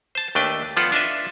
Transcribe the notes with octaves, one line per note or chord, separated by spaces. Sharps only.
C5 A5
D#2 A3 D4 B4 G5
F3 B3 F4 A4 D5 F#5
D4 F4 A4 B4 D#5 E5